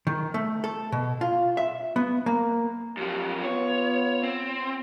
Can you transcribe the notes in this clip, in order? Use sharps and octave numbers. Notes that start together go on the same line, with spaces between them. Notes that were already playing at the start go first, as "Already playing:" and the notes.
D#3
A3
A4
B2
F4
E5
B3
A#3
F#2 F3 G4
B3 F4 C#5
C4